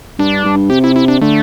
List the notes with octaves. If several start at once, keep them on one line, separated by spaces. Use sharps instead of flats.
G2 D4
G2
C3 G4
E4
E4
D4
D3 A3